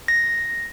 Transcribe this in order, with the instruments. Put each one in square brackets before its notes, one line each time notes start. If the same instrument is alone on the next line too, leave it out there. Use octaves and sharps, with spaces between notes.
[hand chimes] A#6